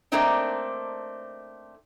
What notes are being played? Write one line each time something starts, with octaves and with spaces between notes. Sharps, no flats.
A3 A#3 C4 D4 D#4 D5